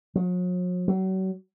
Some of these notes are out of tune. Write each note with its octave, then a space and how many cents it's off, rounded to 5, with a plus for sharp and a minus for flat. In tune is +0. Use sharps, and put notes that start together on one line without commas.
F#3 -45
F#3 +35